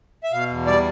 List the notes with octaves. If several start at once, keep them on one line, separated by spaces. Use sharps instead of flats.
E5
B2 F5
E2
G3 D5